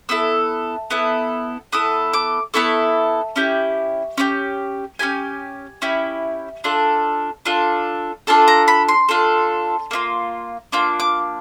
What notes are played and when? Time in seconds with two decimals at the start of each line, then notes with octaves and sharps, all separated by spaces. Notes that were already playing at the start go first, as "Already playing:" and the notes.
0.09 B3 E4 A4 E6
0.91 B3 E4 A4
1.72 B3 E4 A4 D#6
2.13 D6
2.54 B3 E4 A4 C#6
3.36 C#4 E4 G4
4.18 C#4 E4 G4
4.99 C#4 E4 G4 G#5
5.82 C#4 E4 G4
6.64 D4 F4 A4
7.46 D4 F4 A4
8.27 D4 F4 A4 A5
8.48 A#5
8.68 B5
8.89 C6
9.09 D4 F4 A4
9.91 A#3 D4 F4
10.72 A#3 D4 F4 D6
11.00 D6